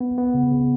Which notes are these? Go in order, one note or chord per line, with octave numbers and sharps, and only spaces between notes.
B3
B3
C#3
C#3